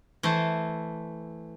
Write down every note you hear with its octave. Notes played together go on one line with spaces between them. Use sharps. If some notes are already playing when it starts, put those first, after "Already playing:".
E3 A3 C5